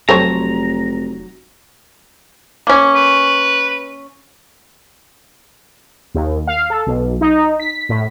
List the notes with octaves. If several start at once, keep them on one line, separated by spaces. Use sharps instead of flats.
F1 F#3 G4 A4 C5 C#5 A#5
A#3 C#4
B4
D#2
F5
A4
B1
D#4
B6
A2